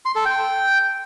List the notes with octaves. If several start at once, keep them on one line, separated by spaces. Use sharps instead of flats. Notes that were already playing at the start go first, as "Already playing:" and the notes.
C6
A4
G5